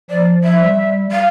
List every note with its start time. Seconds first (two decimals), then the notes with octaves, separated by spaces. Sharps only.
0.10 F3 D5
0.44 E5
0.61 G3
1.12 F5